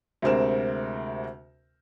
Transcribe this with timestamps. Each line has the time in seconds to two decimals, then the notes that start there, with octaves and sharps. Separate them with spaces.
0.22 D2 C3 G#3 C4 A#4 E7